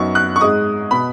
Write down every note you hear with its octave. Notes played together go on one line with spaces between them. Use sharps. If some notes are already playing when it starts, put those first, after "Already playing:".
Already playing: F#2 F#3 B3 D#4 C#6
F#6
C#6
G#2 G#3 D#4 D#6
B2 B3 B5